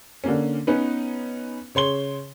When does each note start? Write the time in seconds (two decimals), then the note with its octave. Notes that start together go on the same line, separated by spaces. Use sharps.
0.24 D3 A#3 C#4
0.67 B3 C#4 D#4 B4
1.75 C#3 C#5 C6 G7